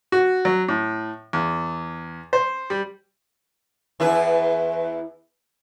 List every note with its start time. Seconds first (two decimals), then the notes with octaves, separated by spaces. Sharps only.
0.12 F#4
0.45 F#3
0.68 A2
1.33 E2
2.33 C5
2.70 G3
4.00 E2 E4 B4